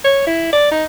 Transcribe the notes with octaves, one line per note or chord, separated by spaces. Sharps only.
C#5
E4
D5
D#4